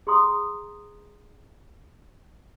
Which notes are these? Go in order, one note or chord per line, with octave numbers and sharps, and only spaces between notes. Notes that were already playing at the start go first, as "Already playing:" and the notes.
G#4 A#5 C6 D#6